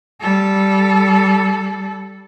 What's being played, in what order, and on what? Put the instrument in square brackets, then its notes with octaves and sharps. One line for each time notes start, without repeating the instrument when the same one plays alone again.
[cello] G3 A4